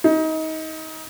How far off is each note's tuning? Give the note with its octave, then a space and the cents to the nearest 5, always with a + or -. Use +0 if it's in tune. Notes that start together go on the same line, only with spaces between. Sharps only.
D#4 +25